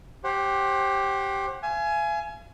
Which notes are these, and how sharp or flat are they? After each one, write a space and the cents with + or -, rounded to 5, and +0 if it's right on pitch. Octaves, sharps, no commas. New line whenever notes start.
G4 +0 C5 +35 F#5 +0
F5 -45 G#5 +20